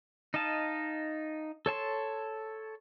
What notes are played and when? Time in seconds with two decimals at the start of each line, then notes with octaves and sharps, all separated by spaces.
0.34 D#4 D#5 F5 A5
1.66 A4 C#5 A5 C6